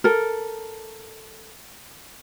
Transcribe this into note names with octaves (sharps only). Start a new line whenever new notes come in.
A4 A#4